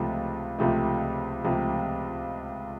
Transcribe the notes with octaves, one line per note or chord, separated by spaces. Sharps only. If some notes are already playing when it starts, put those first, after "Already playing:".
Already playing: C#2 C3 F3 A3
C#2 C3 F3 A3
C#2 C3 F3 A3